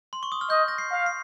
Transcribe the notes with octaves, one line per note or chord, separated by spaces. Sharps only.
C6
C#6
D#6
F6
D#5 G6
A#6
C7
F5
C7